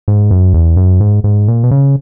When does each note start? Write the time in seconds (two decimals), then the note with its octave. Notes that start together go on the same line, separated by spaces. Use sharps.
0.08 G#2
0.31 F#2
0.54 E2
0.77 F#2
1.01 G#2
1.24 G#2
1.48 A#2
1.64 B2
1.71 C#3